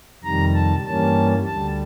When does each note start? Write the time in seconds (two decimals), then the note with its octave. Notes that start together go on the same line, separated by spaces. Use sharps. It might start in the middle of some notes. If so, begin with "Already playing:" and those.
0.24 F2 C3 D#3 G3 A#5
0.54 A5
0.85 G2 E3 G3 A#3 C#4 A5
1.46 D2 D3 G3 A5